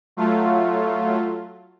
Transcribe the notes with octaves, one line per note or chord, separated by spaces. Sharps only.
F#3 A3 F4